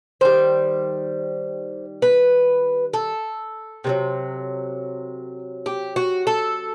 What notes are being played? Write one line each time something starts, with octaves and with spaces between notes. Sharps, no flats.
D#3 G3 C5
B4
A4
C3 D#3 F#3
G4
F#4
A4